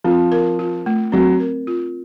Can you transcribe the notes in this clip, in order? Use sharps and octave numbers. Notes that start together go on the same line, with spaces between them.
F3 C4
A#4
F4
A3
F#3 C4
A#4
F4